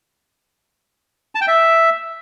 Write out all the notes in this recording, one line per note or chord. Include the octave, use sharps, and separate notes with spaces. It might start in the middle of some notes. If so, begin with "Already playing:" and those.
A5
G5
E5